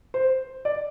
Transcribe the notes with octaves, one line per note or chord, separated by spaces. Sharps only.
C5
D5